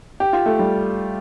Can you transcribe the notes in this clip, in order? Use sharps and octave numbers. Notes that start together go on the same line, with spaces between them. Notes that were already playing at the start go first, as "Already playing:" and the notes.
G4
F4
A3
G3